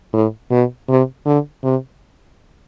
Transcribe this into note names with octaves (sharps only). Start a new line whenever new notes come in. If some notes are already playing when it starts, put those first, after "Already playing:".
A2
B2
C3
D3
C3